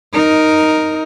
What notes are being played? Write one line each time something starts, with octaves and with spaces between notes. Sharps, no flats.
D#4 A#4